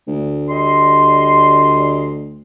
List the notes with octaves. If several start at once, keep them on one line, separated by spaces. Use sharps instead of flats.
D2
G3 D#5 C6